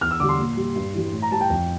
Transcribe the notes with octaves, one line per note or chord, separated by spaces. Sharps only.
E2 F6
E6
D3 G3 D6
C6
A#2
G3
G2
E3 G3
A2
A#5
G3 A5
G5
F2